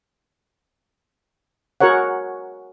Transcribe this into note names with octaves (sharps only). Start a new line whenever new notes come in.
F#4 G#4 A#4 C#5 F#5